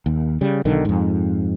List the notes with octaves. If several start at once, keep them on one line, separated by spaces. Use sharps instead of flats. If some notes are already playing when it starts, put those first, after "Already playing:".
D#2
C#3 G3
B1 D3 D#3
F2 G#2